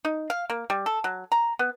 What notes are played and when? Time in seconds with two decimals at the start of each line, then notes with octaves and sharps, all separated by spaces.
0.05 D#4
0.30 F5
0.50 A#3
0.70 G3
0.86 A4
1.04 F#3
1.32 A#5
1.59 B3